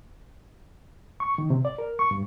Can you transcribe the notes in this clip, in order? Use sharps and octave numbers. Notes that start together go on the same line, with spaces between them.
C#6
D#3
C3
D5
A#4
C#6
G2